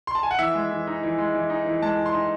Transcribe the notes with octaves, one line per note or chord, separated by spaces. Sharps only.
C6
A5
G#5
F#5
E3 E5
G#3
E3
D#4
E3
G#3
E3
D#4
E3
G#3 A5
E3
C6
D#4